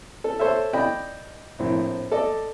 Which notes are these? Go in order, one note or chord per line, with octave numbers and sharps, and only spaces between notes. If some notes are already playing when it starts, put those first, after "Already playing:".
A4
A4 C5 C#5 E5
D5 D#5 G5 B5
A#1 A2 C4
A4 D5 D#5